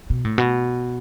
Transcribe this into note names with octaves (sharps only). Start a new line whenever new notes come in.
B2
A2
B2